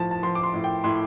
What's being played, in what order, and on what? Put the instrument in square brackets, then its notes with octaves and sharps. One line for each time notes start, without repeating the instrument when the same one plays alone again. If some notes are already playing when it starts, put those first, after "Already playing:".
Already playing: [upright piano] A2 F3 A5
A5
F3 C6
D6
C6
A2
G5
A2 C6